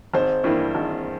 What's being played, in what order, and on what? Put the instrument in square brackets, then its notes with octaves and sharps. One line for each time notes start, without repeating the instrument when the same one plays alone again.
[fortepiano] G#1 [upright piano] C5
[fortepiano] G2 E3 A#3 E4
G#1